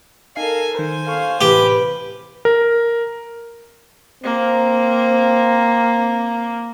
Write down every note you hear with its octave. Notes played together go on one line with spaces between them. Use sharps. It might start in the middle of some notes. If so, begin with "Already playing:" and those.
D#4 A4 A#4 F5 G#5 C7
D#3 A#4 C5 G#5
A4 F5 C#6
A2 C3 E3 G4 B4
A#4
A#3 C4